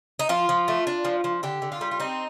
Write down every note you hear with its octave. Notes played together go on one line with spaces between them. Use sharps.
D#4
F3 F4
F3
A3
D4
F3
F3
D3 G4
D3
F4
G3
F4
C4 D#4